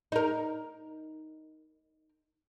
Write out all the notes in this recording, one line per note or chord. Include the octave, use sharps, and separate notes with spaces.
D#4 A#4